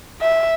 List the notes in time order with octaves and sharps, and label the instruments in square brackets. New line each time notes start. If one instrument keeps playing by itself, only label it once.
[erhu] E5